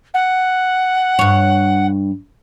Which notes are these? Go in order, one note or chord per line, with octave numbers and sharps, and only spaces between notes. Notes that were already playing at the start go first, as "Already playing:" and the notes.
F#5
G2 C#5